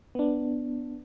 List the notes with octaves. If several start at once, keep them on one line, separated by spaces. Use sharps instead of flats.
B3 D4